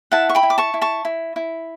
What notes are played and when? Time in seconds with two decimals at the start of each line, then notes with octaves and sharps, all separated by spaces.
0.12 E4 F#5 A5
0.29 C#6
0.35 G5 B5
0.43 E4
0.50 D6
0.58 A5 C#6
0.74 E4
0.81 A5 C#6
1.05 E4
1.36 E4